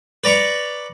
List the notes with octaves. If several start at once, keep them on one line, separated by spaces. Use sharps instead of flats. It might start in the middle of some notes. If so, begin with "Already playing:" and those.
B4 D5 A#5 C#6